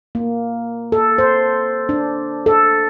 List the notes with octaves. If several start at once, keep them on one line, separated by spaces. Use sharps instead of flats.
A#3
A4
C5
D4
A4